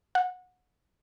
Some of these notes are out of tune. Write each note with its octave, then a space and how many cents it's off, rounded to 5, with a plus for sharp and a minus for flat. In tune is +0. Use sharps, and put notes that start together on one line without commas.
F#5 -25